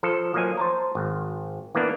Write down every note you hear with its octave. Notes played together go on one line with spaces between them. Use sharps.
F3 A4
F3 F#3 A#3 D#5 G#5
C5 A5 A#5
G#1
E3 A#3 B3 D4